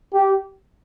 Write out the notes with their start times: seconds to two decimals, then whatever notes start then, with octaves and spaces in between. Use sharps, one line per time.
0.13 G4